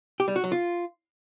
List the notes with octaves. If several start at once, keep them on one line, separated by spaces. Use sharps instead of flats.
G4
G3
F#4
F#3
F4